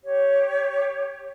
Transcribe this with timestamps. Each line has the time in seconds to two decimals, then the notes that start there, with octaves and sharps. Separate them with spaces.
0.03 G4 C#5